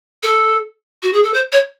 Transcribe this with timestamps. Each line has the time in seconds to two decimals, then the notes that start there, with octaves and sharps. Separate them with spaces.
0.23 A4
1.02 F#4
1.13 G#4
1.23 A4
1.33 C5
1.52 C#5